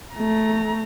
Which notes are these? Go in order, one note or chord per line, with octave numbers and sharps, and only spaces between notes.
A3 A#5